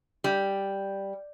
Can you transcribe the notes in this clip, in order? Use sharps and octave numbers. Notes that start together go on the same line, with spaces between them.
G3